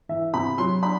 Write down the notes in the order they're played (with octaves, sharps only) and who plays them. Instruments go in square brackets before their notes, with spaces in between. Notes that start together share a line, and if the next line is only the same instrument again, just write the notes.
[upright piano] E3 E5
C3 B5
F#3 C6
D4 B5